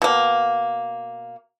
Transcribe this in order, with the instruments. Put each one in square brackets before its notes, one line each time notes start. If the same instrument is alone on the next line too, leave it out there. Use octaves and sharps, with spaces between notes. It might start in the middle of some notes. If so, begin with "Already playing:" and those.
[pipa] B2 A#3